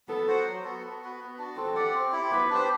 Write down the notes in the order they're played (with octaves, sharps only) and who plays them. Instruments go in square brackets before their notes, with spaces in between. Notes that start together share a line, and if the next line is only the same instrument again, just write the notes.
[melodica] B3 [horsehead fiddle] A4
[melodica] F#4 C5 F#5
F#3
B3 F#4 A4
B3
F#4 B4
B3
D4 F#4
[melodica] C4 [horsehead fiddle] A4
[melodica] G4 D5 F#5
C4
E4 G4
[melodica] B3 [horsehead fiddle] B4
[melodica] D4 G4 C5